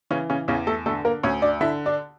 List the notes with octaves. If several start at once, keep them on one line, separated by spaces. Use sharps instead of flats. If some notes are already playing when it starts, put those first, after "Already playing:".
C#3 E3 C#4
C#3 C#4
E2 C#3 C#4
A3 A4
D3 A3 A4
A#3 A#4
D2 C#4 C#5
D4 D5
D3 E4 E5
D4 D5